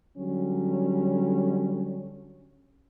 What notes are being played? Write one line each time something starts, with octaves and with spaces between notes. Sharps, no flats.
D3 F#3 G3 C#4